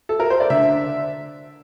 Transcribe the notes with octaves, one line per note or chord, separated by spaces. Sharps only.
A4
A#4
C5
D5
D3 E5